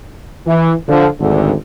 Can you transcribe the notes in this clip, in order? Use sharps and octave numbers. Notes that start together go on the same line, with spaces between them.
E3
D3 F3
G#1 D2 D3